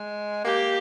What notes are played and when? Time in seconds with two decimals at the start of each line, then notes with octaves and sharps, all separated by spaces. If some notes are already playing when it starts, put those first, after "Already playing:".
Already playing: G#3
0.45 A#3 G4